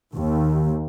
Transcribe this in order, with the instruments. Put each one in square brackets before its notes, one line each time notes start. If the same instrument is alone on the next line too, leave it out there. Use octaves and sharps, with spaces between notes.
[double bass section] D#2